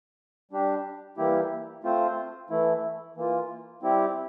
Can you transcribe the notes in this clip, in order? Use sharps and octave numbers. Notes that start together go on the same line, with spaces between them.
G3 D4 G4
E3 G3 A#3 E4 G4
A3 C4 F4 C5
E3 A3 E4
E3 A#3 F4
G3 C4 E4 G4